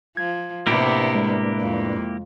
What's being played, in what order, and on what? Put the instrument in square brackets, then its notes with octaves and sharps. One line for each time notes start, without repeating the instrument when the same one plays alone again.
[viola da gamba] F3 [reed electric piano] G#6
[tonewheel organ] A2 D4 B4 [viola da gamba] C3 B3 [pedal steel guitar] A#3 E4 G4
[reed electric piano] G#3
[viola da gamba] F2